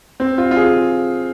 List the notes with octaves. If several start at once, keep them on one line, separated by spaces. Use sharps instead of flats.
C4
F4
F4
G#4